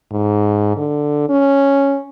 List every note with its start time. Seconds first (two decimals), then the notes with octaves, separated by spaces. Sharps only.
0.12 G#2
0.77 D3
1.29 C#4